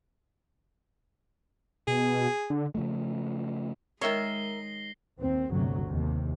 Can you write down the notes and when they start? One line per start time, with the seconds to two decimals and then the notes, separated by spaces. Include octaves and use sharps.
1.87 B2 G#4
2.50 D3
2.75 C#3 F3 A3
4.01 D#3 G#3 A#4 C#5 E5 A#6 C7 G7
5.19 D#2 C4
5.50 G1 D2 C3 F#3
5.85 D#2 C3